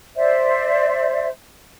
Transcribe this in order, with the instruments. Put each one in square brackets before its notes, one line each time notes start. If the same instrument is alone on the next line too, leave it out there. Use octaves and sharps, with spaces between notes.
[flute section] C5 D5 E5